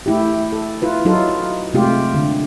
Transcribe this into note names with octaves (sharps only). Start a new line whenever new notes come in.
A3 E4 G4
A4
E4 F4 B4
F#3 D#4 F4 A4
C3 G#3 A3 F4 G4
D3